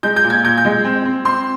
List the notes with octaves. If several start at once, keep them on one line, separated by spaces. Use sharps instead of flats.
G#3 G6
G6
A#2
G#6
A#2 G6
G6
G#3
C4
C4
C4 C6